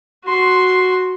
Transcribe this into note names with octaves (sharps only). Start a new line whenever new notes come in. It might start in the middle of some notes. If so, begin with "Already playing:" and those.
F#4 C6